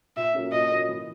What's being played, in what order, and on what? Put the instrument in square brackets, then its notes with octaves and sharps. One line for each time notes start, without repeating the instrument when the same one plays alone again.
[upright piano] A#2 [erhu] E5
[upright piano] F#3 A#3 C#4
[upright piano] A#2 [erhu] D#5
[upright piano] F#3 A#3 C#4
E3